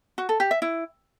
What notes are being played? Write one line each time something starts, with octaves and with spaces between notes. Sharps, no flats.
F#4
A4
G4
E5
E4